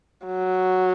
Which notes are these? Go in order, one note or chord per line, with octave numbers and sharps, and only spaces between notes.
F#3